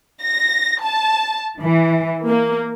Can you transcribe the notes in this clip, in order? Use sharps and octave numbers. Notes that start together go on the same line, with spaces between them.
A#6
A5
E3
A#3